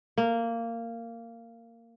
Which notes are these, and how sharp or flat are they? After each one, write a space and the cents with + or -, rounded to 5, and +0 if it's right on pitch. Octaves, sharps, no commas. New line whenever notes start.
A#3 -15